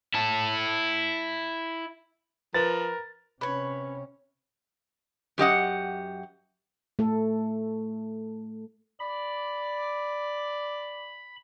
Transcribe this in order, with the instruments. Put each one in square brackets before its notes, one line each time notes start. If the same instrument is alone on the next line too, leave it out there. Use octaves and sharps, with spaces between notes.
[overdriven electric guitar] E4 A5
[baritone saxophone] F3 [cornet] A#4 [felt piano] B4 [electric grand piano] A6
[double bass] C3 C#4 [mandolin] B4 C#5
[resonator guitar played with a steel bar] F#2 G4 D#5 F#5
[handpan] A3 A4
[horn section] D5 [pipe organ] B5